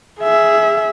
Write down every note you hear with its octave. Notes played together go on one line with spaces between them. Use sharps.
G#4 E5